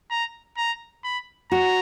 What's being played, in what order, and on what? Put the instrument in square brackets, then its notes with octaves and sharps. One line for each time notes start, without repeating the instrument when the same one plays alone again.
[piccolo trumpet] A#5
A#5
B5
[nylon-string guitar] F#4 [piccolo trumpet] A#5